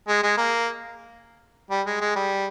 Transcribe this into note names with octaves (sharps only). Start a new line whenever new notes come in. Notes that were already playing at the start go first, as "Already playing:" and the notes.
G#3
G#3
A#3
G3
G#3
G#3
G3